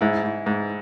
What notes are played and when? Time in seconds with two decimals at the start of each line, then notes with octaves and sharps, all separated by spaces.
0.01 G#2 E4
0.24 G#2
0.46 G#2